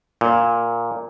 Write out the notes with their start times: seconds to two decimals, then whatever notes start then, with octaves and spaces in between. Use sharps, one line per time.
0.21 A#2